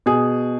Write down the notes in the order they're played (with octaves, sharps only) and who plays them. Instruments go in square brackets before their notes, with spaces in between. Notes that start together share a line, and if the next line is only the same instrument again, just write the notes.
[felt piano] B2 G#4